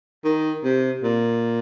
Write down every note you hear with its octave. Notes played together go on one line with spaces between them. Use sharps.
D#3
C3
A#2